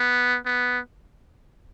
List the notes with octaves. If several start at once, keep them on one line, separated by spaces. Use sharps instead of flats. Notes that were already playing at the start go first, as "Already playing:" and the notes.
Already playing: B3
B3